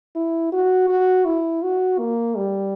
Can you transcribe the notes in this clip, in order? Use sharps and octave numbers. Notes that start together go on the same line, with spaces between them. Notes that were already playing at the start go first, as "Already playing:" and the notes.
E4
F#4
F#4
E4
F#4
A#3
G3